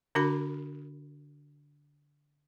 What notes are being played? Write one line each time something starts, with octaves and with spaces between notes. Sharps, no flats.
D3 D4 F#4 A#4 B5